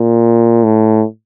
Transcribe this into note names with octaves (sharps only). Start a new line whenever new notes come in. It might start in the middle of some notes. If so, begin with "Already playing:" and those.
Already playing: A#2
A2